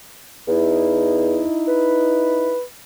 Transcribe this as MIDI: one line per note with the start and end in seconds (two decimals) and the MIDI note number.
0.48 1.41 40
0.48 2.56 63
0.48 2.56 64
1.68 2.62 71